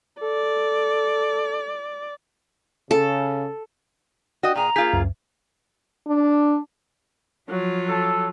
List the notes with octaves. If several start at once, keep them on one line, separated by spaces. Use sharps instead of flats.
A4 D5
C#3 A4
F#4 D5 D#5 G5
A#2 G#4 A#5
A#3 F4 G#4 G6 B6
C#2 F#2
D4
F3 F#3 F4
A4